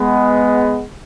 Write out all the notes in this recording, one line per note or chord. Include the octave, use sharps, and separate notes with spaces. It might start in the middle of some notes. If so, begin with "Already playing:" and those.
Already playing: G#3 B3